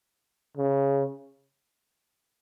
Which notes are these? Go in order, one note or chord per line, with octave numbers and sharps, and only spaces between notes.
C#3